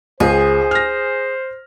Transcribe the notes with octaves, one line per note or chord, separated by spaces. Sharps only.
C#2 G#4 C5
F6 A#6